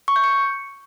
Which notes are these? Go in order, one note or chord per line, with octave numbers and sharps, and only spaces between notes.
C#6
G6
C#7